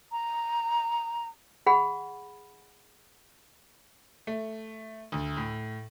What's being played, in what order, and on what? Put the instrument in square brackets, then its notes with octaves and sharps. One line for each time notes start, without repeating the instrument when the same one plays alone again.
[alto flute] A#5
[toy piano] G#4 F#5 B5
[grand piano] A3
D2
A2